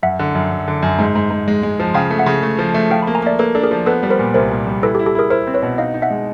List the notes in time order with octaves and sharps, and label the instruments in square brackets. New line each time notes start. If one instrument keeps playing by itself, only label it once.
[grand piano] F#2 [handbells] E5 F#5
[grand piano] D3
F#2
F#2
D3
F#2
G#2
G#2
G#2
G#3
G#3
F3
[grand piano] C#3 [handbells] F5 G5
[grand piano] A3
[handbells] E5 F#5
[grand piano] C#3
A3
F3
A3
[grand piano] F3 [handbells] F5 G5
[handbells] A5 B5
[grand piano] A#3
[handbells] G#5 A#5
[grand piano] A#3 [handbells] D5 E5
[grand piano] A#3 [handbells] A4 B4
[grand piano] D4 [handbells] A4
[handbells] G#4 A#4
[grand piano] F3
[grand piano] B3 [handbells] A4 B4
[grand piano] G3
[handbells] A#4 C5
[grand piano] A#2
[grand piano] C2 [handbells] A#4 C5
[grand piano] A#2
G3
[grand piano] E4 [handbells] A4 B4
[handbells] G4 A4
[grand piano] E4
[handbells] G4 A4
[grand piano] E4 [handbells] G#4 A#4
[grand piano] E4 [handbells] A#4 C5
[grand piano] C4
[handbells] B4 C#5
[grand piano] B2
[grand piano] D#4 [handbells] D#5 F5
[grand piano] D#4
[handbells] E5 F#5
[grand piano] G#3